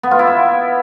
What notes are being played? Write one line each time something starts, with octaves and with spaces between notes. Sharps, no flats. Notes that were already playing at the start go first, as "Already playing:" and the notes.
B3
F4
E4
E5